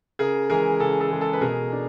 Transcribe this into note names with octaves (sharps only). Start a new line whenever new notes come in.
C#3 G#4 A#4
E3 G#3 G#4 A#4
C#3 A4
A4
E3 G#3
A4
B4
B2 G#4 A#4
D4